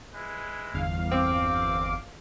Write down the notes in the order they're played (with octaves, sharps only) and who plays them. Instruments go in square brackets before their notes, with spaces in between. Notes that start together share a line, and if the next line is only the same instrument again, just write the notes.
[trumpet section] G#3 E4 B4
[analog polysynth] G1 E2 F5
[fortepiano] C4 [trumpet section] D6